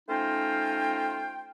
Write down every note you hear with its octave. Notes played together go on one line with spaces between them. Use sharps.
A3 C#4 D#4 F4 C5 G5